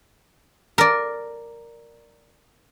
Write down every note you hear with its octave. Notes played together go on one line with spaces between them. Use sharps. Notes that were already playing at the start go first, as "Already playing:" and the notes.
A#4 D5